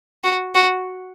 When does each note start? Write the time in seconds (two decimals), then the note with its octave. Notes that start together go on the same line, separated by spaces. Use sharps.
0.24 F#4
0.55 F#4